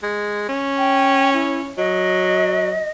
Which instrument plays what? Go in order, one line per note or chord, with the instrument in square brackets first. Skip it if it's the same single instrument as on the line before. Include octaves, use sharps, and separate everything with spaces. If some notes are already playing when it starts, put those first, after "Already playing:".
[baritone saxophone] G#3
C#4
[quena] G5
E4
[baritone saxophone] F#3 [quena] D#5